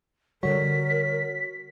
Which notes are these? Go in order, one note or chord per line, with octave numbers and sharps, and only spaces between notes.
D3 G3 F#4 A#4 C#5 B6